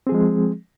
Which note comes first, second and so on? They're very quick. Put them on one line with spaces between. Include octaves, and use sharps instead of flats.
C4 G#4 F3 G#3